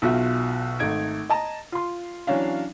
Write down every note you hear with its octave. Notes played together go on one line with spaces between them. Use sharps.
B1 B2 F4 F#4 E5
G#1 A3 D#4 G#6 D7
D#5 A5 A#5
F4 C6
E3 F#3 C#4 D4 F5